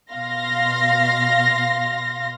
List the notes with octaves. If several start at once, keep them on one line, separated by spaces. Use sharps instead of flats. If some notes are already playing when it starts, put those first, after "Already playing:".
B2 F5 C6 A#6